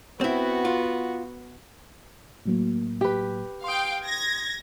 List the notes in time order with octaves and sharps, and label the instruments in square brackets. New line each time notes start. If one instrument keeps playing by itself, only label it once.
[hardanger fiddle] B3 F#4 [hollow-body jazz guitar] C4 E4
[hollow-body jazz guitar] F4
[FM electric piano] A2 F#3 A#3
[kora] G4 B4
[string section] F5 G5 [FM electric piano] C6 D#6
[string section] G#6 A#6